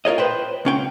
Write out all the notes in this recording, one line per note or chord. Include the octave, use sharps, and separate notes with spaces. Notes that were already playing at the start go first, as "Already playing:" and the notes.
F4 A#4 C#5 D#5
B4 C5 G5
C#2 C#4 G5